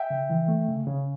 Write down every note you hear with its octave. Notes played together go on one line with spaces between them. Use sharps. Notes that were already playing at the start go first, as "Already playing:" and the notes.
Already playing: E5 G5
C#3
E3
A3
C#3
C#3